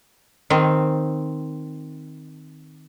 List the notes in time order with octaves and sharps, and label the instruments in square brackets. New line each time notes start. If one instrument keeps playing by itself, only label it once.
[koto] D#3 C4